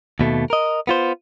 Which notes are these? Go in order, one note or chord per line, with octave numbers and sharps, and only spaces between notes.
D#2 B2 A3
A#4 D#5
B3 F4 C5